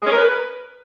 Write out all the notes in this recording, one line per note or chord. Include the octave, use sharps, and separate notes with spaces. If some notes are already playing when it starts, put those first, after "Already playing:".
G#3
C#4
A#4
B4